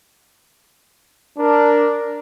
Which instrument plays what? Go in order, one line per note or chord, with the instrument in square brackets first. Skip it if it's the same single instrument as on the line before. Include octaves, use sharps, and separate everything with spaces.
[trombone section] D4 A#4